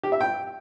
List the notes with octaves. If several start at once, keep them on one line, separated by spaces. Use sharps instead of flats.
G4
E5
G5